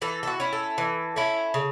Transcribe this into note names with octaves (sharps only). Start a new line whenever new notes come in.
E3 A4
A4
F#4
C#4 E4
A4
E3
C#4 E4
C#3